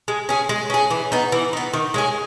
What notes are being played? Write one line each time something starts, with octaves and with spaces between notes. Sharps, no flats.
G#3
C#4 G#4
G#3
C#4 G#4
E3
B3 D#4
E3
B3 D#4
D#3
G#3 C#4 G#4